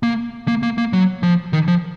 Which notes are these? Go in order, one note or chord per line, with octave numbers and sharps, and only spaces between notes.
A#3
A#3
A#3
A#3
F#3
F3
D#3
F3